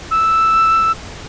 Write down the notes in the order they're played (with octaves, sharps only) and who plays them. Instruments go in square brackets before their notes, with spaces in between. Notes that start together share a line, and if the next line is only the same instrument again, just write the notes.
[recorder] E6